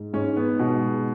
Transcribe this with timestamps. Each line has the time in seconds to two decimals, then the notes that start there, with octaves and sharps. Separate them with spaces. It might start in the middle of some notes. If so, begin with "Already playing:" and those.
Already playing: G#2
0.13 G#2 C#4
0.37 B3
0.59 B2 G#3